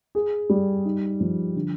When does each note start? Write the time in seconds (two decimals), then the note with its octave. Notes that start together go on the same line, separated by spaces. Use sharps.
0.15 G#4
0.49 G3
0.85 D#4
1.20 F3
1.56 D3